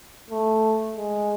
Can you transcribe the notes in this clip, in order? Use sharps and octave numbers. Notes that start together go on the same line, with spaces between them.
A3
G#3